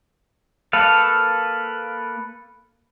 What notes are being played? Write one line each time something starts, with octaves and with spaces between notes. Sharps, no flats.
A#3 A4 B4 F5